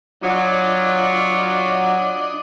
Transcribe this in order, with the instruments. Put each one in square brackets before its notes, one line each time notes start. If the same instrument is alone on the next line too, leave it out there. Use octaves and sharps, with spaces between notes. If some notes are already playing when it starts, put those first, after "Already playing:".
[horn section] F#3 [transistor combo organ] D4 D#5 [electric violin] F4